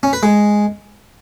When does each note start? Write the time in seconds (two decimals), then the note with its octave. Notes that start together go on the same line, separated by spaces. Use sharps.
0.03 C#4
0.13 B4
0.23 G#3